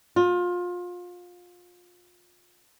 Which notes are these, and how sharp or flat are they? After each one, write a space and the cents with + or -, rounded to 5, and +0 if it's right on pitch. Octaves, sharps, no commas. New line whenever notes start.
F4 +25